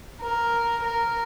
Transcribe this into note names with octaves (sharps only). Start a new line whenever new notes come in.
A#4
A#4